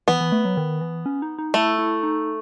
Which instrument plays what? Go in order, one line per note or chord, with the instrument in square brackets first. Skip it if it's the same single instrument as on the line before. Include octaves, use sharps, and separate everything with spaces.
[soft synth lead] E3 [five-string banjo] B3
[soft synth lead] E3
A3
F#3
D#3
E3
C#4
D#4
D#4
[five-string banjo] A3 [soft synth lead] E4
[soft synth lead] E4
D#4